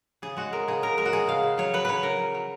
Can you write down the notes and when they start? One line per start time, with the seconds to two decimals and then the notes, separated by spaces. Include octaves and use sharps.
0.22 C#3 G#4
0.37 G#3 F#4
0.53 G#3 A#4
0.68 C#3 G#4
0.82 C#3 A#4
0.97 G#3 A#4
1.05 F#4
1.12 G#3 G#4
1.28 C#3 F5
1.43 C#3
1.58 F#3 C#5
1.73 F#3 B4
1.85 C#3 B4 C#5
2.03 C#3 A#4
2.19 F#3
2.34 F#3